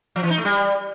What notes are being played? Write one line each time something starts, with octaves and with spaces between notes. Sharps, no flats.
F3
E3
D#4
A3
G3